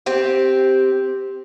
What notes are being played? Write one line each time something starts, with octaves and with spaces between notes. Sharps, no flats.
C4 G4